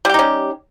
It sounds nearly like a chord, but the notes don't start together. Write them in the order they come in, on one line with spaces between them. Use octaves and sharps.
G3 G4 D#4 C#4